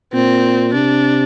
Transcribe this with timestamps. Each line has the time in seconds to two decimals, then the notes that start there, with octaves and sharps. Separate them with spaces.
0.13 A#2 C4
0.74 C3 D4